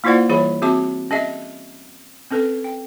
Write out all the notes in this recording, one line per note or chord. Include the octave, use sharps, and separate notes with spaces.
A#3 E4 F4 C5 D5 F#5
E3 G3 G#4 C#5 B5
C4 F#4 G#4 E5 A5 D6
C#4 G#4 D#5 E5
C4 C#4 A4 B4
G5